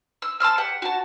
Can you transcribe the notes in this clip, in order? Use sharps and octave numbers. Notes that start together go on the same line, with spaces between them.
E6
A5 C6 E6 F6
G4 F#5
F#4 A5